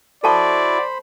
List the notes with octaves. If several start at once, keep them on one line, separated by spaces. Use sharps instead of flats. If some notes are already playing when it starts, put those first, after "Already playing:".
E4 F#4 A4 C5 D5 A5 B5 C#6